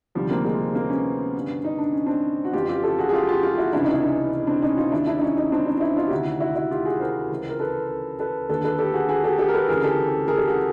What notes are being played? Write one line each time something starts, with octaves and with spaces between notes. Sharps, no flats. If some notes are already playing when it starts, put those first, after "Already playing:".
D2 C3 D#3 F3 G3
A#3 C4
G#3 A#3
A#3 C4
B3 C#4
G2 D3
D#4
D4
C#4
C4 D4
F#4
F2 C#3 E3 F4 G4
F4 G4
G4 A4
F#4 G#4
G#4
F4 G4
F4 G4
F4 G4
E4 F#4
C#2 C3 E3 D4 E4
C#4 D#4
D4 E4
C#4 D#4
C4 D4
C#4 D#4
D#4 F4
D#2 D#3 D4 E4
D4 E4
E4
C#4 D#4
C#4 D#4
C4 D4
C#4 D#4
D#4
D4 E4
D#4 F4
G4
D2 C3 D#3 E4 F#4
E4 F#4
E4 F#4
F4 G4
F#4 G#4
A#4 C5
C#2 C#3 E3
A#4
A4 B4
A4 B4
D#2 D3 A4 B4
A4 B4
G4 A4
F#4 G#4
F#4 G#4
G4 A4
G4 A4
A#4
A4 B4
D2 C#3 E3 G#4 A#4
G4 A4
G#4 A#4
G4 A4
F#4 G#4